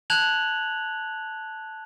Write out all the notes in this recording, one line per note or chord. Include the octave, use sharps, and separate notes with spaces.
A5 F#6 G#6 F7 F#7